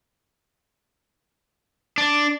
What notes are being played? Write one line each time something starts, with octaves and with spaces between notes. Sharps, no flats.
D4